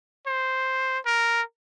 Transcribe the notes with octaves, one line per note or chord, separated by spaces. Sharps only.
C5
A#4